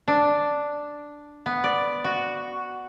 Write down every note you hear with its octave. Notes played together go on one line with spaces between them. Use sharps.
D4
B3
D5
F#4